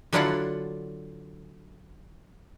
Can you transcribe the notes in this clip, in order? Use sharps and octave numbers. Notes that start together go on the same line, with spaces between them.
D3 F#3 D4 E4 F4 F#5